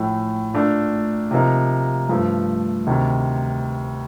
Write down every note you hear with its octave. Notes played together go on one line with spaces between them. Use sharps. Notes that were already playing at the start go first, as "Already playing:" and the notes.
Already playing: A#1 A2 A3
A#2 A3 D4
C3 F3 A#3 D#4
G2 F3 A3
D2 C3 D#3